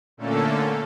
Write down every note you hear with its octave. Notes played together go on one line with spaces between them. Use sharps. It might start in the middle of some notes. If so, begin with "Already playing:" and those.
A#2 D3 A3 A#3 C#4 A4